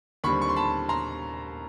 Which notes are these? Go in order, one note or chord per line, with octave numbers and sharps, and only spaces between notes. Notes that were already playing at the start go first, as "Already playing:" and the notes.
D#2 D3 G3 C4 B5 C#6
C#6
C6
A5 B5
A#5 C6